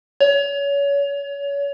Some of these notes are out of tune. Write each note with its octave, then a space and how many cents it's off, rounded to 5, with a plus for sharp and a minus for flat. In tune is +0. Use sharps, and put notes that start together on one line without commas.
C#5 +30